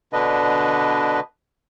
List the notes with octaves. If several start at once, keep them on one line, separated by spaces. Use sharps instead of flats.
B2 D3 D4 B4 D#5